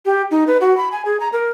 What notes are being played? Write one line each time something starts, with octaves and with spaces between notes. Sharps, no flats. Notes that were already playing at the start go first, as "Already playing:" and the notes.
G4
D#4
B4
F#4
B5
G#5
G#4
A#5
A#4